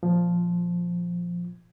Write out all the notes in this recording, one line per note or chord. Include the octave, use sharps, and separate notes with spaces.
A#2 F3